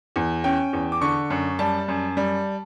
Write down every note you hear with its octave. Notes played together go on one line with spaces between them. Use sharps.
E2
C#4 G5
E2
D6
D3 C#6
F#2
G3 A5
F#2
G3